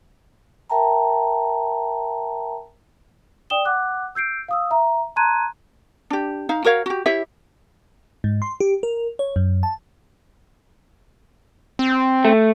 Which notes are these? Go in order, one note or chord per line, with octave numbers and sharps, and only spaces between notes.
A#4 E5 G5 A5 A#5
D5 G5 D#6 E7 G7
F#5 D6 F#6
E6 G6 C7 D7
F5 D#6 E6
E5 A#5
A5 A#5 C6 F#6 G#6 D#7
D4 G4
D#4 F5
F#4 A#4 C#5 F5
F#4 G4
E4 G4 C#5 E5
G#2
C6
G4
A#4
C#5
F#2
A5
C4
A3